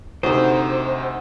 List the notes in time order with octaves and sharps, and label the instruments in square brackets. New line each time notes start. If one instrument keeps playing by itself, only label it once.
[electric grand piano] D2 C3 [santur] D#4 F#4 [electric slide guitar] C5